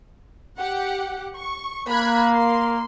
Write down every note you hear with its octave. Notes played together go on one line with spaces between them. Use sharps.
G4 F#5
C#6
A#3 B5 F#6 G#6
C6